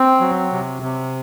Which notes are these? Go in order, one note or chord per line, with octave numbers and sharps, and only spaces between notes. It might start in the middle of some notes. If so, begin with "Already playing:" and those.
Already playing: C4
F#3
C3
C3